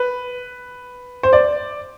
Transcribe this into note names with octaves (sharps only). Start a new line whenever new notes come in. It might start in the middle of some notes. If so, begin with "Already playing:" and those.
Already playing: B4
C5
D5